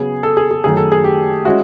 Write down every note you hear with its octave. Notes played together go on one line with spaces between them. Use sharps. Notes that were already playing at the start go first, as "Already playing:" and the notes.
Already playing: C#3 F#3 B3 G#4
A4
G#4
G#4
F#2 D#3 F#3 A3 C#4 G#4
A4
G#4
G4
G#3 C#4 E4 F#4